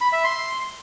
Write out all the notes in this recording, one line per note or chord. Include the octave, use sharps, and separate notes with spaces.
B5
E5
C6